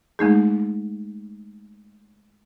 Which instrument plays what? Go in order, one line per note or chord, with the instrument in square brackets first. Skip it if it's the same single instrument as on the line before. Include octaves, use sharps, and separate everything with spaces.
[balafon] G#3 A3 D#4 G#4